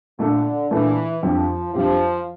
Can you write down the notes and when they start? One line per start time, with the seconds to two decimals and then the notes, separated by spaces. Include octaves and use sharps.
0.19 A#2 D3 A3 D4 A4
0.71 A#2 E3 A3 D4 A4
1.22 F2 D3 F3 G3 C4 G4
1.74 F2 D3 F3 G3 C4 G4